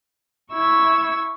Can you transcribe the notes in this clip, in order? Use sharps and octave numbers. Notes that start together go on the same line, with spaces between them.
E4 C#6 E6 G#6